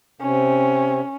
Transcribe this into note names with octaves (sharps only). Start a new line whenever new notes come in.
C3 C#4